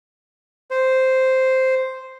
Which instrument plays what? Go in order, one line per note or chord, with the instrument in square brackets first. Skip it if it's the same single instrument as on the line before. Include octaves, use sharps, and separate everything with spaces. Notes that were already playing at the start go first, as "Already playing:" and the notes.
[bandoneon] C5